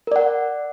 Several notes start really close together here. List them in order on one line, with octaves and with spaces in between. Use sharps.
A#4 D5 F#5